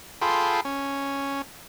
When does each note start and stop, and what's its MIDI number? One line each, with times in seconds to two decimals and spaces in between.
0.22 0.61 65
0.22 0.61 68
0.22 0.61 69
0.22 0.61 79
0.22 0.61 83
0.22 0.61 84
0.65 1.42 61